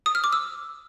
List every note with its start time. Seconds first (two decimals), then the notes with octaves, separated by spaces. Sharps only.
0.06 D#6
0.15 F6
0.24 D6
0.33 E6